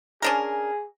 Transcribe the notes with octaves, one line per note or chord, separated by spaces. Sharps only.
C#4 D4 G#4 A#4